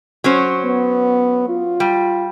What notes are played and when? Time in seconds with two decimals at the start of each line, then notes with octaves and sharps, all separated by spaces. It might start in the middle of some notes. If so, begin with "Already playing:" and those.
0.24 F#3 C#4 C5
0.65 B3
1.49 F4
1.80 G3